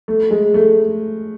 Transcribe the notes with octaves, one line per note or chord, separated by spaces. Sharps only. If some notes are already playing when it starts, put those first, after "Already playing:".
A3
G#3
A3